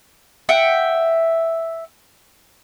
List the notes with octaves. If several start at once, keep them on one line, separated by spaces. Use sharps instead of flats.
E5 F#5 G5